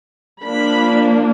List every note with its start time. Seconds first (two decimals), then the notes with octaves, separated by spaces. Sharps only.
0.44 F3 A#3 D4 B5